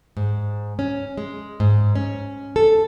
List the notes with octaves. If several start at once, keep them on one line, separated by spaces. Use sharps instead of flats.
G#2
C#4
G#3
G#2
C#4
A4